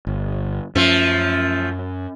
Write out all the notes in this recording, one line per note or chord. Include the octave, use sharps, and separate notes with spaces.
G1
F#2 F3 A3 C#4